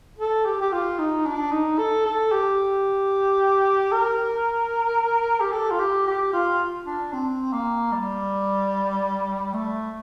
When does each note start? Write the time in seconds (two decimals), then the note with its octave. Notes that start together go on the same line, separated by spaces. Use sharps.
0.18 A4
0.45 G4
0.61 G4
0.73 F4
0.98 D#4
1.26 D4
1.52 D#4
1.78 A4
2.06 A4
2.32 G4
3.92 A#4
5.40 G4
5.53 A4
5.71 F4
5.79 G4
6.07 G4
6.33 F4
6.85 D4
7.13 C4
7.53 A#3
7.92 G3
9.53 A3